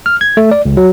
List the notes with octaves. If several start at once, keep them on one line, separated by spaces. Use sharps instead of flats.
F6
G#6
A3
D5
C#2
F#3